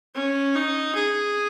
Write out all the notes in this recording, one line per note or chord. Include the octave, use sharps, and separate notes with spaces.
C#4
D#4
G#4